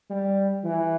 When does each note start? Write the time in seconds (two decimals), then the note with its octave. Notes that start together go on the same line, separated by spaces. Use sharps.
0.10 G3
0.64 E3